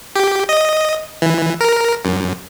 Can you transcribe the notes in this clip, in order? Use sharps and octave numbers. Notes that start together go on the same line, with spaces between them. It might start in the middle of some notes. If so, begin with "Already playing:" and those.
G4
D#5
E3
A#4
F#2